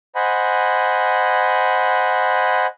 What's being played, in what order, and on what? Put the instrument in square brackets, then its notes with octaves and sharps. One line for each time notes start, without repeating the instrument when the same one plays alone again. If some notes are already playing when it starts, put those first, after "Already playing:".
[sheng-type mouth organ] C5 D#5 F#5 G#5 B5